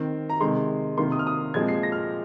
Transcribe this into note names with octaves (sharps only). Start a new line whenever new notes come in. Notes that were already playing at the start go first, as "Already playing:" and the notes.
Already playing: D#3 C4
A#5
C3 D#3 G#3 C6
C3 D#3 A#3 C6
D#6
F6
D#6
A#2 F3 G#3 C4 G#6
C7
A#6
F6